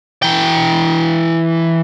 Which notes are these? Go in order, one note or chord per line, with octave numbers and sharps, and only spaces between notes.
E3 G5